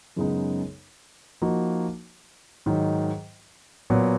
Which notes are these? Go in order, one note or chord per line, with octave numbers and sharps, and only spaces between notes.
F#2 C#3 G#3 B3 D#4
F3 A#3 D#4 F#4
G#2 D#3 F#3
A#2 F#3 B3